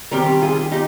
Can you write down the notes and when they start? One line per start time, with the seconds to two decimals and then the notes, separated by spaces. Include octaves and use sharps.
0.11 D#3 G3 C4 G4 A#4
0.42 F4 G#4
0.72 D#4 G4